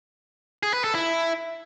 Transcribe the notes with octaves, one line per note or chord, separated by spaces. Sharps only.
G#4
B4
A4
E4